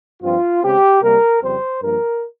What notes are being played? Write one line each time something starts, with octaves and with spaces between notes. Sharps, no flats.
G2 F3 C4 F4
C#3 G#3 C4 G4
C3 G3 A#3 A#4
F2 C#3 G3 C4 C5
G2 F3 A#3 A#4